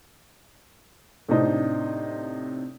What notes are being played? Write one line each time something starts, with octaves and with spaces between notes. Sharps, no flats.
A2 C3 C4 D4 D#4